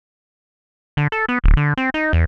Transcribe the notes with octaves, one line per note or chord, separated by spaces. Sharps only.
D3
A4
B3
D1
D3
C4
D#4
E2